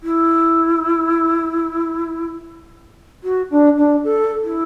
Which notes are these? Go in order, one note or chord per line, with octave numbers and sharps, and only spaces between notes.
E4
F#4
D4
D4
A4
E4